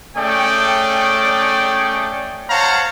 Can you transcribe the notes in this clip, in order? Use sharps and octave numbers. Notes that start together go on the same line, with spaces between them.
A3 C#4 G#4 D5 G5
C5 C#5 F5 F#5 A5 A#5